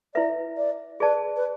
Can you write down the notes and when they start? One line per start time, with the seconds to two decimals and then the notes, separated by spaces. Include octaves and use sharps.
0.14 E4 B4 D5 E5
0.57 D5
1.00 G#4 B4 D5 A5
1.37 B4